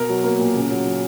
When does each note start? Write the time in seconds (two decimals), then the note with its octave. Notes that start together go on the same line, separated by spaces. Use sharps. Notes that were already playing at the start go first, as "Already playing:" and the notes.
Already playing: B2 A#4
0.09 F#3
0.24 A#3
0.39 A#2
0.55 C#3
0.70 F#3